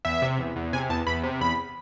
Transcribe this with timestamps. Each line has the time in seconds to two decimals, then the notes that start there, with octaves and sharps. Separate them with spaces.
0.05 E2 E5
0.22 C3
0.39 E2
0.56 E2
0.73 C3 G#5
0.90 E2 A5
1.06 E2 B5
1.23 C3
1.41 E2 B5